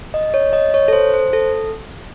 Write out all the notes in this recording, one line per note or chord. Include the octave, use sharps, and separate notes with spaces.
D#5
C#5
D#5
C#5
A4
C5
C5
A4